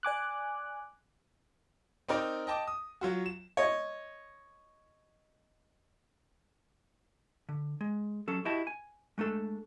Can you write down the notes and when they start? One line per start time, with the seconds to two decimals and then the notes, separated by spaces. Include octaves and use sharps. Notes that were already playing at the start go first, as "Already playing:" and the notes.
0.03 D5 G#5 D6 F#6
2.09 C4 D#4 A#4 D5
2.47 D#5 G5 A5 D6
2.67 D#6
3.01 F#3 F4 F#4
3.26 E7
3.57 C#5 D#5
7.49 D3
7.81 G#3
8.28 F#3 C#4 A4
8.45 E4 F#4 G4 D#5 A5
8.67 G#5
9.18 G#3 A3 D4 A4